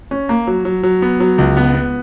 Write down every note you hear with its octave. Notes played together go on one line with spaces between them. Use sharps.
C#4
A#3
F#3
F#3
F#3
B3
F#3
C#2
B3
B3